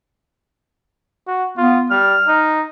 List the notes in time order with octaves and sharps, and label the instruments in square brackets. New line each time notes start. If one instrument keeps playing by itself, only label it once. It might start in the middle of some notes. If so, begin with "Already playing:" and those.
[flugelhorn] F#4
[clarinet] B3 [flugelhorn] F4
[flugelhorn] G3 [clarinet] F6
[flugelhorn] D#4